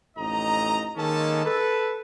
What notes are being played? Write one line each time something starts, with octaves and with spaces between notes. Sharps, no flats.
A1 F2 D#4 D#5 A#5
D#3 G#3 A#3 C#4 A4 A5
A4 B4 A5